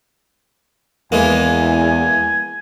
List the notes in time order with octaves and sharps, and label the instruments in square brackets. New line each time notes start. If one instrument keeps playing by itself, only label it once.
[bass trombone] E2 [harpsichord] E3 G#3 A#3 [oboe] G#5